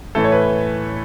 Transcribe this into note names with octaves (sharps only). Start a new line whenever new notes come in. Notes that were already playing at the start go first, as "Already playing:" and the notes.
A2 E3 A3 A4
C#5
B4